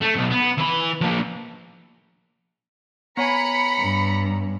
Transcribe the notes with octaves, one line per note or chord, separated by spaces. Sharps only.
A3
B1
B3
E3 B5
F3 A#3
B3 C#5 G#5 A#5 B5 C#7
G2